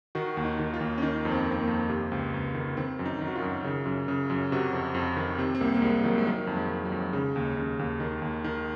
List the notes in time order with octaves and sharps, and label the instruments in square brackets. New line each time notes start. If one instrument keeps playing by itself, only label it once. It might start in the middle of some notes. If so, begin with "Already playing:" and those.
[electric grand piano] D#3 F#4
D#2
D#4
D#3
F4
D#2
C#4
D#3 D#4
F2
C4
D#3
C4
A#3
F2
C3
C#2
C#2
D#3
D#3 C4
F#2
D#4
D#3
F#4
F4
F#2
C#3
F#2
C#3
F#2
C3 F#4
F2
F2
D#3
C3 C4
C4
C2 A#3
A#3
C2 G#3
D#3 F#3
G#3
D#3 F#3
F2
G#3
D#3
F#3
F2
C#3 G#3
D#2
C#3
D#2
D#3
D#2
D#3